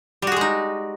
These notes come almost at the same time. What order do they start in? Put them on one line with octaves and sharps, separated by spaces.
G3 F#4 G#4 G#3 D#4